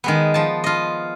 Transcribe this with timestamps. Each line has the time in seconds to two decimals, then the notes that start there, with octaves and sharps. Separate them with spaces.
0.04 D#3 G#3 B3
0.34 F3 A5
0.64 F4 D#5